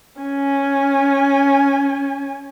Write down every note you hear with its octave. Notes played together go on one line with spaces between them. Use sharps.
C#4 G#5